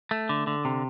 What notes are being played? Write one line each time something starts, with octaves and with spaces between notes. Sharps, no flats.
A3
D3
D3
C3